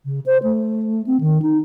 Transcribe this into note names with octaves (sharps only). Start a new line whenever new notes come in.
C#3
C5
A3
C4
D#3
D#4